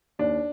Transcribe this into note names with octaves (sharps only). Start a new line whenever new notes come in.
D#2 D4